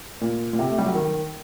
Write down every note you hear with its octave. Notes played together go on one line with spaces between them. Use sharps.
A#2
A#2
C3
A3
G3
F#3
D#3